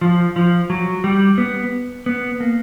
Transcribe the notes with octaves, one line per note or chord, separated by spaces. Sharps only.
F3
F3
F#3
G3
B3
B3
A#3